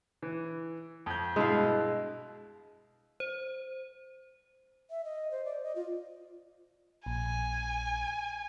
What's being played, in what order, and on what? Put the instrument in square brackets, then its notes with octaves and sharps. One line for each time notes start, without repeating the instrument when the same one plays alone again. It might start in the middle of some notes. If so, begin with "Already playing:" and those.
[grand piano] E3
F2 G6
[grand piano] G2 B2 E4 [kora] G#3 F5
[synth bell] C5
[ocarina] E5
D#5
C5
D5
D#5
F4
[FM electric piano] A#1 [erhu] G#5